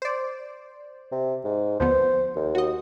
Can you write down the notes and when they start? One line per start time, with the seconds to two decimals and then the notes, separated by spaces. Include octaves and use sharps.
0.02 C5 D5
1.12 C3
1.45 G#2
1.80 D2 F3 B3 C5
2.36 D#2
2.55 F#4 D#5